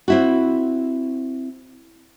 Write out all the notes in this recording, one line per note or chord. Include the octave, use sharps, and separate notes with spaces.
C4 E4 F#4